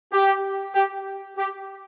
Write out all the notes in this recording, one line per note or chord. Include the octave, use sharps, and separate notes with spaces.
G4
G4
G4